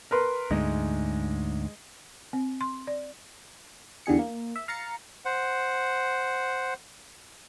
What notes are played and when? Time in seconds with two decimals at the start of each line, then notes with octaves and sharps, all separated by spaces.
0.11 A#4 B4 C6
0.51 D2 G#2 G#3
2.33 C4
2.61 C6
2.87 D5
4.06 E2 D3 G3 G#4 C#7
4.19 A#3
4.56 E5
4.68 F5 A#5 A6 C#7
5.25 C5 F#5